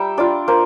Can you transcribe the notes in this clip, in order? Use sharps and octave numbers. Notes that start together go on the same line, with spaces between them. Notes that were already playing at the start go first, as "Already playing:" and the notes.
Already playing: G3 E5 G5 A#5
D4 F4 D5
A#3 C5